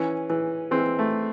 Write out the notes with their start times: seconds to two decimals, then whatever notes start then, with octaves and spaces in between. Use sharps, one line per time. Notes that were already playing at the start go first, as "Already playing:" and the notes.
Already playing: E3 C#4
0.30 E3
0.71 E3 C4
0.99 A3